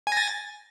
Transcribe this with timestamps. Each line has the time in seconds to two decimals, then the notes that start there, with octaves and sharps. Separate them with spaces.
0.07 G#5
0.12 A#6
0.17 A6